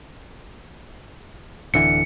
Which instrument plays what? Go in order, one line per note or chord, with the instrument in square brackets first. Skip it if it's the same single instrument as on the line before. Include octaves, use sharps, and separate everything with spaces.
[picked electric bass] D1 D3 E3 [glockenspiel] C#7